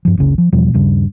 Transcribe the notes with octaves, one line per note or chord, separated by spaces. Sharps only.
G2 F3
F#1 C#2 C#3
F3
E2 B2 F3 G3
D#1 G2 C#3